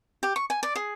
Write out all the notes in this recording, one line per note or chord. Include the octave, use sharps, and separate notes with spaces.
G4
C#6
G#5
D5
G#4